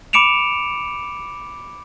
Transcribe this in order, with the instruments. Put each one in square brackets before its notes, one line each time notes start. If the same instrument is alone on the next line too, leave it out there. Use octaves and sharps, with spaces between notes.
[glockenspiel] B5 D6 C#7 D7 E7 F7